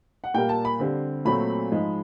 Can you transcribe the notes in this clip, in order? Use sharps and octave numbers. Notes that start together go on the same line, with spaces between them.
F#5
A#2 G3 A#3 G5
A5
B5
D3 G3 C4
A#2 F#3 A3 C4 B5
G#2 F3 G#3